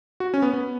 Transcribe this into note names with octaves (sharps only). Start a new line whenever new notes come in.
F#4
C#4
B3
B3